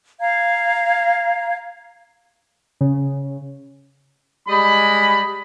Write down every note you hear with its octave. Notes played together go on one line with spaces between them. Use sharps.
F5 A#5 G#6
C#3
G3 G#3 D#5 B5